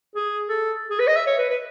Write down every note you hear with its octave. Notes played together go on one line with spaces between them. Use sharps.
G#4
A4
G#4
B4
D#5
E5
C#5
B4
B4